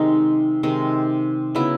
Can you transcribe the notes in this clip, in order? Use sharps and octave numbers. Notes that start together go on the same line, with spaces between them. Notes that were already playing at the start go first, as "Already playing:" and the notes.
Already playing: C3 D#3 G#3 D#4
C3 D#3 G#3
C#3 F#3 B3 E4